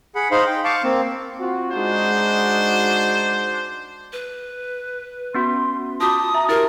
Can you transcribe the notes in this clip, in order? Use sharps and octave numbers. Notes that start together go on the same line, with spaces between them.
G#4 F#5 B5
D#4 C5 F5 B5 C6
G5
F5 A5 C#6 D6
A#3 C4
C4 F4 F#4
G#3 D4 D#4 F#4 C5
B4
B3 C#4 F#4 C6
F4 F#4 A5 D6 D#6
E5 A#5
E4 G4 A#4